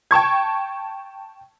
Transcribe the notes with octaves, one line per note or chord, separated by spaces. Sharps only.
G5 A5 C#6 G#6